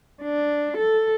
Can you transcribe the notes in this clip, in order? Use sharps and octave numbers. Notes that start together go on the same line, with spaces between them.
D4
A4